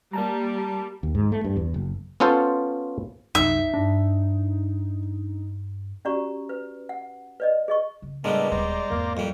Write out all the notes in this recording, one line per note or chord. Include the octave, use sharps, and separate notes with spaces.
G3 A#3 A5 A#5
D#2
G#2
A3
G2
E2
F#1
B3 C#4 F4 A4 C5
C2 F#2 D#4 E5
G2 D4
C#4 F#4 G4 D5 A#5 C#6
B4
F#5
B4 D5 D#5
G#4 D#5 C#6
C#3
A2 G3 G#3 B3 D4 A#4
D#1 C#4 C5 D5 A#5
G#1 E2 A#3
F2 G3